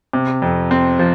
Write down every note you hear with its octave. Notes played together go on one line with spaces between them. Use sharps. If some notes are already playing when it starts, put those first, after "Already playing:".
C3
F2
C4
F3